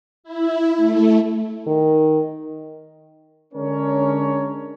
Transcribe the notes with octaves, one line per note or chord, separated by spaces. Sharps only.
E4
A3
D#3
D3 G#3 C#4 D4 A#4 C#5